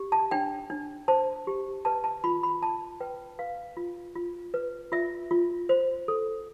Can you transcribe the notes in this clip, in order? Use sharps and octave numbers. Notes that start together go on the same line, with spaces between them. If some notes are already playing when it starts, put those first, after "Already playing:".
Already playing: G4
A5
D4 G5
D4
C5 A5
G4
B4 A5
A5
F4 B5
B5
F4 A5
B4 G5
B4 F5
F4
F4
B4
F4 E5
F4
C5
A4